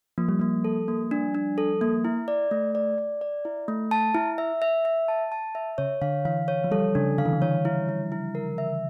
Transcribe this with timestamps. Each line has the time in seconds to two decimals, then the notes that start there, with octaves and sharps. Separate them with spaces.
0.18 F3 A#3
0.29 G3
0.39 F3 A#3
0.64 A4
0.88 A#3
1.11 D4
1.34 D4
1.58 A4
1.81 A#3
2.05 E4
2.28 D5
2.51 A3
2.75 D5
2.98 D5
3.21 D5
3.45 E4
3.68 A3
3.91 A5
4.14 E4
4.38 E5
4.62 E5
4.85 E5
5.08 A5
5.32 A5
5.55 E5
5.78 C#3 C#5
6.02 D3 F5
6.25 E3 F5
6.48 C#5
6.64 F3
6.71 G3 A4
6.95 C#3 D4
7.18 D3 F5
7.26 E3
7.33 D3
7.42 E3 C#5
7.65 E4
7.89 E4
8.12 E4
8.35 A#4
8.58 E5